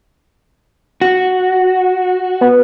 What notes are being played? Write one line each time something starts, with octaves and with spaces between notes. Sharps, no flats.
F#4
B3